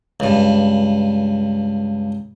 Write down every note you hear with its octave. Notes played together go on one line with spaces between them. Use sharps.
C#2 G2